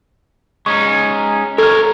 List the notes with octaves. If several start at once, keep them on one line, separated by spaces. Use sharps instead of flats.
G#3 C#4 D#4 C#6
A4 A#4 C#5 F6